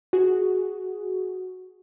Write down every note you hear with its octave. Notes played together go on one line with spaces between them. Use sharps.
F#4 G#4